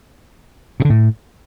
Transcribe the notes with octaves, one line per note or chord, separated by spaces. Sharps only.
B2
D3
A2